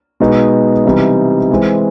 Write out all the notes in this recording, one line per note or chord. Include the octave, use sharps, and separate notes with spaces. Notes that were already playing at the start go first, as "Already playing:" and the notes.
B2 G#3 B3 D#4
C3 E3 G3 B3 D#4
E3 G#3 C4